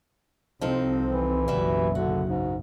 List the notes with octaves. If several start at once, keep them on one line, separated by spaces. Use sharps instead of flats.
C2 F3 C4 D#4 A4
E3
F#1 B1 C#3 G3 F#4 E5
D3 F#4
G#2